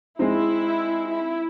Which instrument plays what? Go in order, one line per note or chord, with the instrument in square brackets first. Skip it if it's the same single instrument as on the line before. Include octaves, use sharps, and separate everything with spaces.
[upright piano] G#3 C4 D#4 [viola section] E4
[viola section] E4